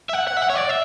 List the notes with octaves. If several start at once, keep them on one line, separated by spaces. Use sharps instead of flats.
E5
F#5
F#5
E5
F#5
C#5
D5
E5